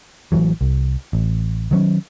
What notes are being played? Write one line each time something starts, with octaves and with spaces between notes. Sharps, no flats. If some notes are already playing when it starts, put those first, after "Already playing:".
A1 C3 E3 F#3
C2
A1
D#3 F#3 C#4